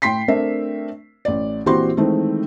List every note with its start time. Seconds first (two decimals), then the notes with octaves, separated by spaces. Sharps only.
0.02 A2 G5 C6 B6 C7
0.28 A3 C4 D4 A#4 E5
1.25 A1 D5
1.66 A#1 E3 C4 F#4 G4 C6
1.97 D#3 E3 G#3 A3 C4